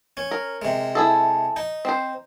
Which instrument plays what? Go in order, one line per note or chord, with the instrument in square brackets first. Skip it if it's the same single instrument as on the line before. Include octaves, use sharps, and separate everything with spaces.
[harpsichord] C#4
[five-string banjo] A#4
[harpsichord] C3 G#3
[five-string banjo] E4 G#4 A4
[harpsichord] D#4
[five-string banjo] C4 C5